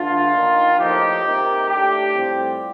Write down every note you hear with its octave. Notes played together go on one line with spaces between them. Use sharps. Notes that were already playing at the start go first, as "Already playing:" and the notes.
Already playing: G2 D3 A3 D4 F4
D#3 A#3 D#4
A2 F3 A#3 D#4 G4
C3 D#3 A#3
A2 A3 D4 G4
A2 G3 C4 F4